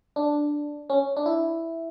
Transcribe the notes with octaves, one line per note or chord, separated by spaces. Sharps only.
D4
C#4
D4
E4